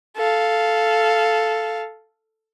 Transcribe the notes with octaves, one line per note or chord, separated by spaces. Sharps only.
A4 F5